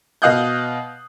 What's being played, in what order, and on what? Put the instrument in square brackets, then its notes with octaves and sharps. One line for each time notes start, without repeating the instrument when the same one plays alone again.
[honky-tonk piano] B2 D#5 F5 D#6 F#6 G6